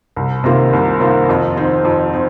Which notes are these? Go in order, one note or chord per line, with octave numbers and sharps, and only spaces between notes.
C2
C3 D#3 A#3 F4
C2
C3 D#3 A#3 F4
F2
D#3 C4 D#4
F2
D#3 C4